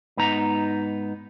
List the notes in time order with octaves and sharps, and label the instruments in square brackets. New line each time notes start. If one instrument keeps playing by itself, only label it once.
[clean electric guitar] G#2 B3 D#4 A#5